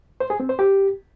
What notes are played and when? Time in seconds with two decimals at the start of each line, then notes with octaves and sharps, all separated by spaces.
0.20 C5
0.30 G#4
0.40 C4
0.49 C5
0.59 G4